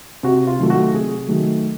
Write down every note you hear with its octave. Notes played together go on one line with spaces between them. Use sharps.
C3 F#4
F4
D#3 F#3 A3
F#4
C3 G#4
D#3 F#3 A3